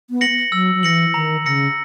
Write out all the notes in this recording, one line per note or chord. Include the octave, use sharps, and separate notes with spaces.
B3
A#6 C#7 F#7
F#3 E6
F#3
E3 A#6 C#7 F#7
D#3 A#5
C#3 E6 A#6 C#7